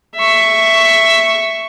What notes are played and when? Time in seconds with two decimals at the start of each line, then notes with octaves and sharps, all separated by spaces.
0.16 E5 C#6